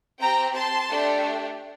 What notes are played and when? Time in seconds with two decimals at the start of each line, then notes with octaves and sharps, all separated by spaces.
0.20 C4 G4 G5 A#5
0.54 A5 C6
0.89 A3 D4 G4